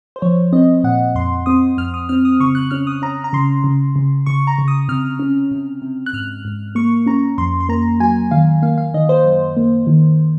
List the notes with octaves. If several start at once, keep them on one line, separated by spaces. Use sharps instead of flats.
C5
F3 C#5
C4 D#5
A#2 F#5
F2 C6
C4 D#6
F2 F6
D#6
C4 F6
D#6
C#3 C#6
F#6
C#4 F6
D#6
C#4 A#5
A#5
C#3 C6
C#3
C#3
C#3 C#6
A#5
C#3
D#6
C3 F6
C#4
C3
C3
F#6
G#2 F6
G#2
A#3 C#6
C#4 A#5
F2 C6
C6
A#3 A#5
F#3 G#5
D#3 F5
A#3 F5
F5
D#3 D#5
C5
F#2
A#3
D#3